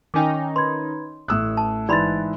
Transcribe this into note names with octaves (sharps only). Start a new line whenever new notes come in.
D#3 C#4 D#4 G5 G#5 D6
B4 B5 C6 G#6
A1 A2 D#6 E6 F#6
A5
G#2 E3 E4 D5 B5 C6 A6